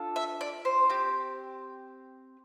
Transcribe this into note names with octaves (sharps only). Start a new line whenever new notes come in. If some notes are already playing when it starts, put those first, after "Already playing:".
Already playing: D4 F4 A4
E5
D5
C5
C4 G4